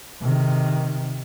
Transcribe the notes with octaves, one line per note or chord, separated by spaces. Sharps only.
C3 D#3